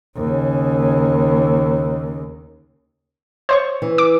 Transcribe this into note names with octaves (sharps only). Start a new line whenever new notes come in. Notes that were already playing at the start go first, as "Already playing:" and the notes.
D#2 C#3
C5 C#5 C#6
E3
D6